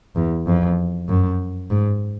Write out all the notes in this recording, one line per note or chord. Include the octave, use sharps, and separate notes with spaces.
E2
F2
F#2
G#2